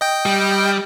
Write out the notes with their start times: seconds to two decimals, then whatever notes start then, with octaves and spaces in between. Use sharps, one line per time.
0.01 D#5 G5
0.26 G3